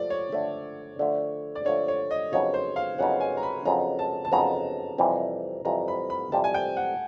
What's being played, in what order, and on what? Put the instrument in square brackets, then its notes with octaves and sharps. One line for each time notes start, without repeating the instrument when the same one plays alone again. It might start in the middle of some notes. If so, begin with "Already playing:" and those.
Already playing: [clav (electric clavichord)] F3 A3 [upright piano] D5
[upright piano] C#5
[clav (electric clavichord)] D3 F3 A3
D3 F3 A3
[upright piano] D5
[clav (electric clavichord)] D3 F3 A3 [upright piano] C#5
[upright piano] C#5
D#5
[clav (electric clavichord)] F2 C#3 F#3 B3 D#4 [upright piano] C#5
[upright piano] C5
F5
[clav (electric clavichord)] F2 C#3 F#3 B3 D#4 [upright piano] F#5
[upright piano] G#5
A#5
B5
[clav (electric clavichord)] F2 C#3 F#3 B3 D#4 [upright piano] A#5
[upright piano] A5
A5
[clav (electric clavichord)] F2 C#3 F#3 B3 D#4 [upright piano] A#5
[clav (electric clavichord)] F2 C3 E3 G3
[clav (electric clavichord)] F2 C3 E3 G3 [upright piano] A#5
[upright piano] B5
B5
[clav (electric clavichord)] F2 C3 E3 G3 [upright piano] A5
[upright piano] G#5
G5
F#5